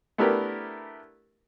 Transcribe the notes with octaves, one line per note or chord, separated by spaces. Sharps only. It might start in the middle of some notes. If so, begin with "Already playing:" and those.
A3 B3 D4 E4 G4 A#4